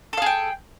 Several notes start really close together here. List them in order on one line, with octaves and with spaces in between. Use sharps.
A4 F5 G#4 G5